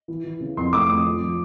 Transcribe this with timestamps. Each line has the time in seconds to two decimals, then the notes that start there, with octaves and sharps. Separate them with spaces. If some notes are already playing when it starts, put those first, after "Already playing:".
0.08 E3
0.24 E3
0.41 C#3
0.57 F2 C6
0.73 A3 D6
0.89 F2 D#6
1.05 F3
1.22 F3